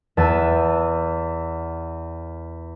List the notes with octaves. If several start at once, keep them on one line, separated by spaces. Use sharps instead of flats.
E2 A5 E6 F#6 D#7